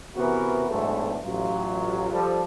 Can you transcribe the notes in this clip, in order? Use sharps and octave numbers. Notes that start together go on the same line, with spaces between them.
C3 E3 B3 F#4 A#4
B1 E2 G#2 F#3 A3 D4
A1 F#3 F4
F3 G3 A4